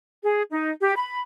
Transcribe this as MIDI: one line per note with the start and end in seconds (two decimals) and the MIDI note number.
0.24 0.42 68
0.51 0.69 63
0.80 0.94 67
0.96 1.20 83